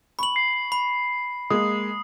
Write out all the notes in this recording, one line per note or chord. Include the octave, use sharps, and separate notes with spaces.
B5 C#6 F#7
C7
B5
G#3 A#3 D#6